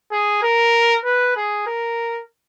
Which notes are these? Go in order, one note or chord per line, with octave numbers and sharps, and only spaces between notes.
G#4
A#4
B4
G#4
A#4